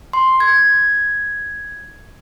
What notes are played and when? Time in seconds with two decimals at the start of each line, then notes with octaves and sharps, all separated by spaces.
0.13 C6
0.40 G#6